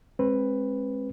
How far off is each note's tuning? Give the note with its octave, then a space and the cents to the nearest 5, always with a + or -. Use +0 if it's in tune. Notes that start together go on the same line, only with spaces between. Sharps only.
G#3 +0 C4 +30 B4 +0